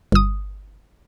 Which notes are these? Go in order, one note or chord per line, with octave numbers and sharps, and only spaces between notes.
G1 D#6